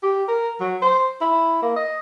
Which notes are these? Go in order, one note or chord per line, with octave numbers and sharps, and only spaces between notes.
G4
A#4
F#3
C5
E4
A#3
D#5